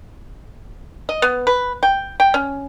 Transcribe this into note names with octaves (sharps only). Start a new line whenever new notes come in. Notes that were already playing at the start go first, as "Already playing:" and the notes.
D#5
B3
B4
G5
G5
C#4